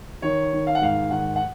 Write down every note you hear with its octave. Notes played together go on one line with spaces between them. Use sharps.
D#3 C#5
D#3
F5
F#5
G#2 F5
D#3 F#5
F#5